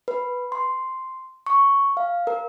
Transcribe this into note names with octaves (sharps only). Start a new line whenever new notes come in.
B4
C6
C#6
F5
A#4